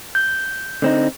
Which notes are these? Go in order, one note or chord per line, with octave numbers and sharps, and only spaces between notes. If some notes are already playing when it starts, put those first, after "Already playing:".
G6
D3 C4 D#4